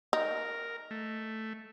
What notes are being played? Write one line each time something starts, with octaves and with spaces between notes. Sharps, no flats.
D#4 A#4
A3